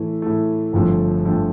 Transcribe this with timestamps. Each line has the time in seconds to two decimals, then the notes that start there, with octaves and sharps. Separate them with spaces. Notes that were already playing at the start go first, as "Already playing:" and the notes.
Already playing: A2 E3 A3
0.22 A2 E3 A3
0.73 G1 F2 D3 F3 A3
1.25 F2 D3 F3 A3